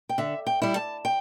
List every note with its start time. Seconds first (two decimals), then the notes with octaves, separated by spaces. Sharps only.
0.09 G5
0.18 D3 E5
0.47 G5
0.62 G3 E4
0.76 A5
1.05 G5